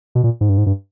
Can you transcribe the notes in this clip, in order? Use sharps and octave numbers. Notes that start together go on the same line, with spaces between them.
B2
A#2
G#2
G2
G#2
G2